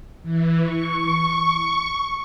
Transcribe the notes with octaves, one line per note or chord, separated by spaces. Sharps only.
E3
C#6